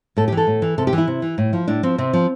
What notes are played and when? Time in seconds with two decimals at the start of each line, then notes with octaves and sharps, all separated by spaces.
0.17 A2 A4
0.28 G4
0.32 E3
0.37 A4
0.47 A2
0.62 E3
0.78 C3 A4
0.87 G4
0.93 E3
0.98 E4
1.07 C3
1.22 E3
1.38 A2
1.53 F3
1.68 A2 D4
1.83 F3 C4
1.98 C3 C4
2.13 F3